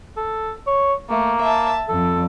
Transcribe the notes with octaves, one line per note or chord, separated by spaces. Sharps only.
A4
C#5
A3 A#3
E5 A5
F2 A4